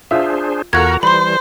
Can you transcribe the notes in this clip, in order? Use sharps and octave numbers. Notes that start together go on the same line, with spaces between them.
D4 F4 G#4 C5 E5
E2 F4 F#4 A4 A#4 A#5 F#6 G#6
E3 G3 C5 B5 C6